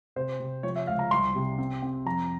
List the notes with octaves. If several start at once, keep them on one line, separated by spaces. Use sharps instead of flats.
C3 C5
C3
F3 C#5
E5
C#2 F5
A#5
C2 C6
C3
C4
C4
F2 A#5